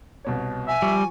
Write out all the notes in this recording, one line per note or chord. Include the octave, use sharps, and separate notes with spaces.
C2 B2 C#5
E5 G#5
F3 G3 C#6